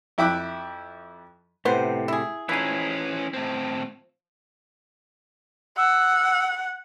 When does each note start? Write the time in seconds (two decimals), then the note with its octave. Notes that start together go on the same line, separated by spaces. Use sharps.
0.18 F2 E4 E5 G5 D6 F#6
1.65 A2 C3 B3 C5
2.08 E4 G#4
2.49 E3 F3 C#4 D#4 E4 G#4
3.34 A2 C4
5.77 F#5 E6